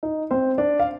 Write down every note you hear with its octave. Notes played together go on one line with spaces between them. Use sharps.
D#4
C4 C5
D4 D5
F5